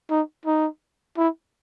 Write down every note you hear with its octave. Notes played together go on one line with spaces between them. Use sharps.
D#4
D#4
E4